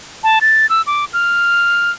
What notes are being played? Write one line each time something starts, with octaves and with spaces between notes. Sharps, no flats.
A5
A6
E6
D6
F6